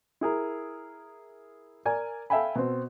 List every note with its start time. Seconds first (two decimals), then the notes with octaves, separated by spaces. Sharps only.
0.21 E4 G#4 A#4
1.85 A#4 D5 G#5 G#6
2.30 A4 E5 F5 G5 G#5 B5
2.55 B2 C4